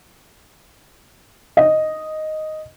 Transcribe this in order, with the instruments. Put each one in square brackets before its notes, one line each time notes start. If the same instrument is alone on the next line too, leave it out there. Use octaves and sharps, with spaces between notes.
[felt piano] D#5